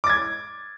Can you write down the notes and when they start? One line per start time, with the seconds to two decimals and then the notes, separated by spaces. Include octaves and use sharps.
0.04 D6
0.07 A6
0.10 G#6